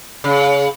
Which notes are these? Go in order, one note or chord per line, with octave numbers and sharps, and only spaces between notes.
C#3